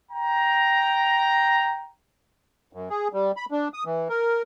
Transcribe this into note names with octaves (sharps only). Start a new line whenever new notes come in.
G5 A#5
F#2
G#4
G3
B5
D4
D#6
E3
A#4